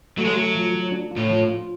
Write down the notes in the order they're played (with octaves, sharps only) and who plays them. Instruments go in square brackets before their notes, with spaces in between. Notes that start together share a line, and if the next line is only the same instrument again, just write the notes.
[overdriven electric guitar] F#3 [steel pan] A3
[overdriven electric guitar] G#3
[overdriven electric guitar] F#3 [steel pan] A3
[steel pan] F3
F3
D4
F4
[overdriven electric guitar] A2
[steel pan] F3
F4